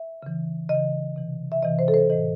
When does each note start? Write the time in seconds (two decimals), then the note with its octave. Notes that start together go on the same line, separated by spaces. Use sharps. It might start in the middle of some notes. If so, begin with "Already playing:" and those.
Already playing: E5
0.23 C#3 E3
0.69 C#3 D#5
0.75 E3
1.16 C3 E3
1.52 E5
1.63 C3 E3 D#5
1.79 C5
1.88 A4
1.94 C5
2.10 A2 E3 D#5